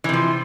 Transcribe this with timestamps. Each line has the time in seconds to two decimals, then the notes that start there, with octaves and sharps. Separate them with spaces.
0.04 E3
0.09 C3
0.13 F3